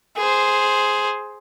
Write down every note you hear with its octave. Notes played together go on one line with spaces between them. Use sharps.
G#4 C5